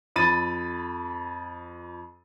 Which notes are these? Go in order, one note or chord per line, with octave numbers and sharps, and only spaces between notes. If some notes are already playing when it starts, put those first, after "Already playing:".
F2 B5 A6 D#7